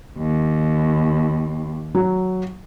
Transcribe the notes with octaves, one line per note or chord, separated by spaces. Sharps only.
D#2
F#3